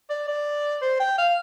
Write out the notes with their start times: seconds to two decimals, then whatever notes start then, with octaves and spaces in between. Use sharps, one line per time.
0.10 D5
0.28 D5
0.82 C5
0.99 G5
1.18 F5